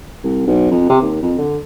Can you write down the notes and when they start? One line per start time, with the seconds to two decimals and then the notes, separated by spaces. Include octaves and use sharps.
0.24 C2
0.47 B1
0.71 F2
0.89 C3
1.02 D#2
1.22 F2
1.38 D3